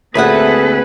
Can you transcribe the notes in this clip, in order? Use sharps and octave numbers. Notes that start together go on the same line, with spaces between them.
D2 A#3 C4 G#4 A4 B4 E5 F#5